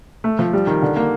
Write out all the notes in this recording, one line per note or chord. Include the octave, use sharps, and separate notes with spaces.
A3
F3
G3
D#3
D3
A#3